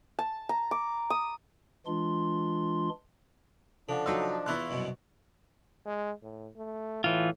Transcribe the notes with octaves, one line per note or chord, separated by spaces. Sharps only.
A5
A#5
D6
D#6
E3 G#3 D4 F4 C6
C#3 F3 D4 A4 F5 F#5
F#3 D#4 D#5 C6 E6
E2 B3 E4 F4 C6 C#6 F#6
C2 F#2 B2
G#3
A2
A3
A2 E3 F4